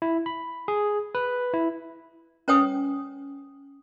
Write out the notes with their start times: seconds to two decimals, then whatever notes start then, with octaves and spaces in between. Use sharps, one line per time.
0.02 E4
0.26 B5
0.68 G#4
1.15 B4
1.54 E4
2.48 C#4 B4 C#5 G5 G#5 D#6